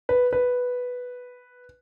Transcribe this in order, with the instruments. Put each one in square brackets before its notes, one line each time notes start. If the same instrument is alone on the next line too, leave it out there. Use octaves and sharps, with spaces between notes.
[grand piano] B4
B4